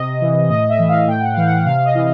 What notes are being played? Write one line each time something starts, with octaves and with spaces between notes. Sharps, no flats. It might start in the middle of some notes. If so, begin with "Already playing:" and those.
Already playing: C3 D#5
E3
A2 D#5
E5
E3
F5
A2 G5
F#5
E3 F5
F#5
C3 F5
D#5
E3